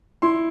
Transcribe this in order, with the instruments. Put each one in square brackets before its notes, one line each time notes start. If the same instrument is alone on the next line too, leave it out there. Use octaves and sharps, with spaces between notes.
[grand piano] E4 C6